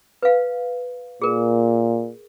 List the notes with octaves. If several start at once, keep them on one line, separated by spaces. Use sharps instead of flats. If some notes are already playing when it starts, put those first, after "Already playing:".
B4 F5
A#2 G#4 A#4